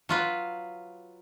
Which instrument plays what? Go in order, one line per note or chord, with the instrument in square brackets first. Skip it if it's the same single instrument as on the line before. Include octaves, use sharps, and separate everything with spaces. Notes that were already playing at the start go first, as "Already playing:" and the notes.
[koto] F#3 F4 B4